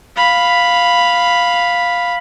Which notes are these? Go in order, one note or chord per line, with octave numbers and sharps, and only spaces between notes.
F5 B5